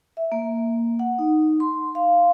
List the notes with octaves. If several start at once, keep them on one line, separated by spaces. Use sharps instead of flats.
E5
A#3
F#5
D#4
C6
F5